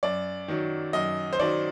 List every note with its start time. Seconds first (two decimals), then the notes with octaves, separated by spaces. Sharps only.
0.03 F#2 D5
0.48 D#3 F#3
0.93 F#2 D#5
1.33 C5
1.39 D#3 F#3 D5